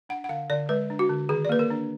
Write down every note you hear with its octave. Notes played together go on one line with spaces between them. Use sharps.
D4 F#5
F#5
D3 F5
D3 D5
G#3 B4
D4
F#4
D3
D#3 G#4
D5
A#3 B4
A#4
D4